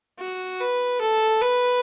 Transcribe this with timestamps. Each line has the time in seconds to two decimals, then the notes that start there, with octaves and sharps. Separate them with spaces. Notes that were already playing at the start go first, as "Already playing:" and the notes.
0.20 F#4
0.60 B4
1.01 A4
1.42 B4